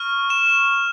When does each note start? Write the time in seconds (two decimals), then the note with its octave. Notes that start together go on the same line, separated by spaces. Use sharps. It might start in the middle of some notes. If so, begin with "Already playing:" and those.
Already playing: C#6 F6
0.30 E7